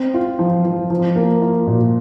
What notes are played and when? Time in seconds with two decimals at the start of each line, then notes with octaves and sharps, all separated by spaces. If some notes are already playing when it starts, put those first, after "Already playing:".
Already playing: C4
0.14 F4
0.39 F3
0.64 F3
0.90 F3
1.16 A#3
1.42 F4
1.67 A#2